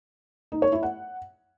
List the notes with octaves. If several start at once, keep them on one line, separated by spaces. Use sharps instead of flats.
D#4
C#5
E4
F#5